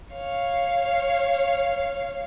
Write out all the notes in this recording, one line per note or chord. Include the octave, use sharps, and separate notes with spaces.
C#5 F5